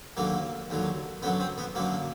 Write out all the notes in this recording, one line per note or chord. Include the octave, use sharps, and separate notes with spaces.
D#2 D3 F#3 A#3
D#2 D3 F#3
F#2 D3 F#3 B3
C4
B3
F#2 D3 F#3 A#3